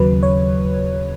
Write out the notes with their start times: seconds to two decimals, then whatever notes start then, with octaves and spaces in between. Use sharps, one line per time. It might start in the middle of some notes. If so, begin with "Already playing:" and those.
Already playing: D#2 C#3 F#3 B4
0.23 C#5